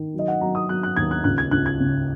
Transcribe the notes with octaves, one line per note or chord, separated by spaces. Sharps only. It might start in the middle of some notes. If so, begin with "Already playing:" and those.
Already playing: D#3
F#3 D#5
F#5
F#3 A#5
D#6
F#3 F#6
F#6
D#2 G#6
F#6
C#2 F#6
G#6
C#2 F#6
G#6
C#3